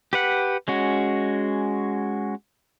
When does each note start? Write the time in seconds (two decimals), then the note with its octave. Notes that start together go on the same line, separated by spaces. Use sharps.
0.13 G4 B4 F#5
0.68 G#3 C#4 F#4